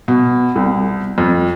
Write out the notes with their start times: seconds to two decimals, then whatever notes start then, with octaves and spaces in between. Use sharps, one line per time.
0.08 B2
0.56 C2
1.18 F2